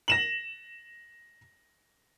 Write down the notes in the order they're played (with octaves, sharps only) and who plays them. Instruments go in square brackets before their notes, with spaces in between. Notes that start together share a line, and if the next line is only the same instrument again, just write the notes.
[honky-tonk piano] A#6 E7 F#7